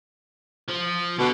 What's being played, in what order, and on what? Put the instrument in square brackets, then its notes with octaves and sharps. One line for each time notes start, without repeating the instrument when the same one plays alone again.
[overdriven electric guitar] F3
[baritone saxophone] B2 [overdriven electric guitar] D3